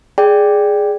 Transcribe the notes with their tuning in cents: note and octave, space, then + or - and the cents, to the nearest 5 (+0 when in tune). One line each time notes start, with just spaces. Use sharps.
G#4 +0 D5 +0 G5 +0